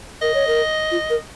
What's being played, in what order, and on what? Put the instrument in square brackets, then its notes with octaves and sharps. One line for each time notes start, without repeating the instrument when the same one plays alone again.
[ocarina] A#4 [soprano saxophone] D#5
[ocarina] C#5
A#4
F4
A#4